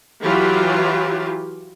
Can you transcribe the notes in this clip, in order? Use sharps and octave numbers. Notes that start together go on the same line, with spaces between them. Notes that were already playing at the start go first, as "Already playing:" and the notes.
E3 F#3 F4 G4